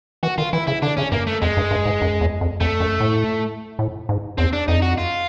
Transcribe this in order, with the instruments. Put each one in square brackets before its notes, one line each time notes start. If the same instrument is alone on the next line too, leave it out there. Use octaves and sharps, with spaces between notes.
[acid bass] E3 [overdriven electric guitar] F#4
[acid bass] D#3 [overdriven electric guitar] F4
[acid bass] E3 [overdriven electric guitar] E4
[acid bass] C#3 [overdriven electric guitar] E4
[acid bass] D3 [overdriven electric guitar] D4
[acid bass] C#3 [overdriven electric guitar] C#4
[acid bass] G2 [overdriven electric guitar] A#3
[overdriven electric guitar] A3
[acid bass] F2 [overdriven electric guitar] G#3
[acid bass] G2
G2
G#2
F#2
E2
F2
[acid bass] F2 [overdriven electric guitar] A3
[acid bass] F#2
A2
A2
G#2
[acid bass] E2 [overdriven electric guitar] C4
[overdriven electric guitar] D4
[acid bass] F2 [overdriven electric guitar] D#4
[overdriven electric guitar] F#4
F4